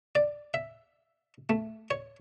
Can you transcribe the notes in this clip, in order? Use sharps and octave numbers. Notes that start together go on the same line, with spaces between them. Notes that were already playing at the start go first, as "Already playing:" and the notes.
D5
E5
A3
C#5